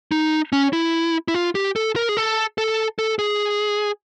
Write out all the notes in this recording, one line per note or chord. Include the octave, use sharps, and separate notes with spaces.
D#4
C#4
E4
E4
F4
G4
A4
A#4
G#4
A4
A4
A4
G#4